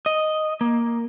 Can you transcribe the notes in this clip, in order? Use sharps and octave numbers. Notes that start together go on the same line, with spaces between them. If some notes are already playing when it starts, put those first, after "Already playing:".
D#5
A#3